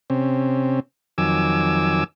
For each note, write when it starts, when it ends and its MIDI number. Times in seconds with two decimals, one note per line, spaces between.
0.10 0.80 48
0.10 0.80 60
0.10 0.80 61
1.18 2.04 41
1.18 2.04 51
1.18 2.04 54
1.18 2.04 80
1.18 2.04 86
1.18 2.04 88